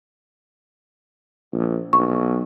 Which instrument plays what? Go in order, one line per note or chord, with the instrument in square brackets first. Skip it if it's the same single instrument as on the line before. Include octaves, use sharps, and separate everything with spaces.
[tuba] A#1
[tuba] B1 [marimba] C#6